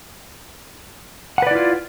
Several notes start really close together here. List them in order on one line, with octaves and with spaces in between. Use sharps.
F#5 B4 D5 E4 F4